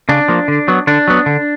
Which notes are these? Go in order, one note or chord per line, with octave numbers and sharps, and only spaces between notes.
C#3 D4
F3 A#3
D3
F#3 B3
D3 D4
F#3 B3
D3